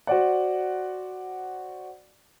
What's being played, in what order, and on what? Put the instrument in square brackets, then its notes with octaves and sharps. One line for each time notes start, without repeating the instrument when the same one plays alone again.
[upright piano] F#4 C5 D5 F#5